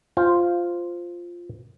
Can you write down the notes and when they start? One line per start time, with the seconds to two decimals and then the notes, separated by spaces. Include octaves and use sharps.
0.17 F4 C5